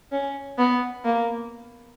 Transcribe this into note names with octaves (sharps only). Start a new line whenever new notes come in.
C#4
B3
A#3